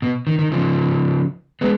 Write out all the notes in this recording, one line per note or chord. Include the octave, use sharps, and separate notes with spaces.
B2
D#3
D#3
C#3 F3
G#3 B3